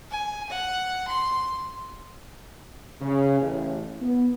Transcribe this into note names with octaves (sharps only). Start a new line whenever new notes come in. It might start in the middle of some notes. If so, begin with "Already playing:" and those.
G#5
F#5
C6
C#3
A1
B3